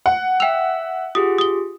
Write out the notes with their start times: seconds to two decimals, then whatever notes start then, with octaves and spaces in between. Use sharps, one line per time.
0.06 F#5
0.40 E5 G5 E6 F7
1.15 F4 G4 G#4 D#6
1.38 D#6 G7